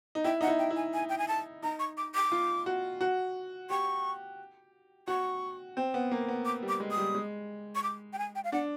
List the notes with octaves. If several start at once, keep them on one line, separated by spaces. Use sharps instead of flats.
D#4
E4 G5
D#4 F#5
E4
G5
E4
G#5
G#5
G5
G#5
A5
D#4 A#5
C#6
D6
D6
F4
F#4
F#4
G4 C#6
F#4 C#6
C4
B3
A#3
B3
D6
G3
D6
G#3
D#6
G3
G#3
C#6
D6
G5
G#5
G5
F5
D4 F#5